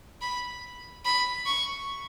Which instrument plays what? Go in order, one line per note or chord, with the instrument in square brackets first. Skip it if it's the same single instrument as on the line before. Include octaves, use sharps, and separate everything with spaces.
[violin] B5
B5
C#6